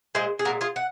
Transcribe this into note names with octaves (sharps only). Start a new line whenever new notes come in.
A#2 G#3 G#4 C5
G#4
A#2 G#3 F#4 A#4
F4 G#4
F#5